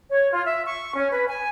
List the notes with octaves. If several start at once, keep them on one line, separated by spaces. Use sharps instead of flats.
C#5
F4
E5
C#6
C#4
B4
G#5